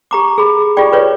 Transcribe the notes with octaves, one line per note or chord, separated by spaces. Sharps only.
G4 A#5 D6
G#4 B5
F4 G4 G#4 D5 G5
B4 C#5 D5